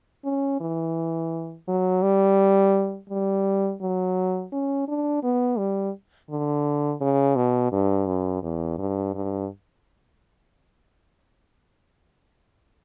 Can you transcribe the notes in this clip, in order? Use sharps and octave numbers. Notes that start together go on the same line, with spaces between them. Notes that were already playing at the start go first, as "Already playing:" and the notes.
C#4
E3
F#3
G3
G3
F#3
C#4
D4
B3
G3
D3
C#3
B2
G2
F#2
E2
G2
G2